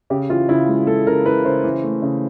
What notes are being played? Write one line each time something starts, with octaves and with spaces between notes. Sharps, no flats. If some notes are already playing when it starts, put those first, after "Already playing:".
C#3 G4
E3 F4
C#3 E4
G#3
G#3 A4
C#3 A#4
E3 B4
C#3 C5
E3
A3
C#3